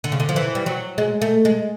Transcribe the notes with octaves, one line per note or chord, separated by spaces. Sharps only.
D3
C#3
D3
F3
E3
G3
F#3
G#3
A3
G#3